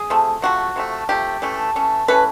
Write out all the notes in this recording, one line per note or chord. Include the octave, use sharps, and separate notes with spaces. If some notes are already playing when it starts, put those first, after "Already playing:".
Already playing: G#4
C3 F3 A3
C3 F3 A3 F#4
C3 F3 A3
C3 F3 A3 G4
E3 A3 C#4
E3 A3 C#4
E3 A3 C#4 B4